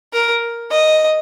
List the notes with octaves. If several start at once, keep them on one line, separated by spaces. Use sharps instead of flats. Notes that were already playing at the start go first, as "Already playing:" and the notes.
A#4
D#5